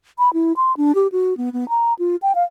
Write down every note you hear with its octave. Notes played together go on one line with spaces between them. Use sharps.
B5
E4
C6
D4
G4
F#4
B3
B3
A#5
F4
G5
F5